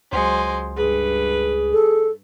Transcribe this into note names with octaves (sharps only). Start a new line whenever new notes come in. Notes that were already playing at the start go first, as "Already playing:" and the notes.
C#2 F#3 G#3 C5
G2 G#4 B4
A4